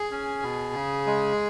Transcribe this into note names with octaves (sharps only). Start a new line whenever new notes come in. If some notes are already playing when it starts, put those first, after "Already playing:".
Already playing: G#4
C#4
B2
C#3
G#3